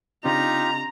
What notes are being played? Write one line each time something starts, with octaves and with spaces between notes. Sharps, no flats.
C#3 C4 D4 D#4 F4 G4 A#5